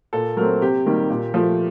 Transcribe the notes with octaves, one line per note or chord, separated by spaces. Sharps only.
A#2 A4
F#3 A3 C4 A#4
C3 G4
D#3 G3 A#3
A#2
F3 A3